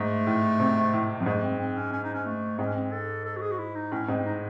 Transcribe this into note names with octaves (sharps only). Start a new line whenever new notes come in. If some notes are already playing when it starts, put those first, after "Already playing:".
Already playing: G#2 A3
A2
C3
A2
F#2
G#2 A3
C4
C4
C#4
C#4
D#4
C#4
A3
G#2 C4
C#4
C4
A4
A4
F#4
G#4
F#4
E4
D#4
A2 C#4
G#2 C4
D#4